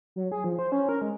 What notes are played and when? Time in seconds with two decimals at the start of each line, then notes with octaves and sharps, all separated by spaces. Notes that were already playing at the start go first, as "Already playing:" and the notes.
0.16 F#3
0.32 G#4
0.44 F3
0.59 C5
0.72 C#4
0.89 A#4
1.02 G#3